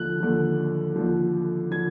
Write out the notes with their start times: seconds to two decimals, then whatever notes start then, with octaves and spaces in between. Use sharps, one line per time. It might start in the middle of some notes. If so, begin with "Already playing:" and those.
Already playing: D#2 D3 F3 F#6
0.20 D#2 D3 F3
0.96 D#2 D3 F3
1.71 D3 F3 G#6